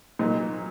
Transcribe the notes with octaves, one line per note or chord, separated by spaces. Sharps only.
A#2 F#3 A#3 D#4